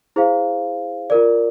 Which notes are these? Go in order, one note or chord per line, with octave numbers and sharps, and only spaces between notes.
E4 G#4 C5 F5
F4 A#4 D5